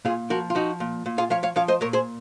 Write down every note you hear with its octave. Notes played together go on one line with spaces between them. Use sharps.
A#2 F4 G#4
F3 F#4 A#4
F4
F3 D#4 F#4
A#2
A#2
F4 G#4
F3 C#5 F5
C#5 F5
F3 C#5 F5
C5 D#5
A#2 A#4 C#5
G#4 C5